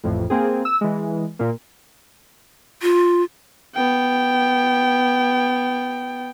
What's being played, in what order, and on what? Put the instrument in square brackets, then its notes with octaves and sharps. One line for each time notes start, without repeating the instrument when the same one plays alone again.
[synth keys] A1 F2 A2
A#3 C4 G#4
E6
E3 G#3
A#2 A#3
[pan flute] F4
[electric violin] B3 G5